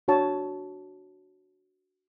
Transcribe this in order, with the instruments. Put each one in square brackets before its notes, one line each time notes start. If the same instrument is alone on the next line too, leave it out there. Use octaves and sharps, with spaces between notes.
[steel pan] D4 F#4 C#5 A5